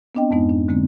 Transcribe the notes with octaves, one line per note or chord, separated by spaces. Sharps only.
B3 C4 D4 D#5 G5
F2 G#2 G#3 B3 D#4
D4
D3 G#3 A#3 C4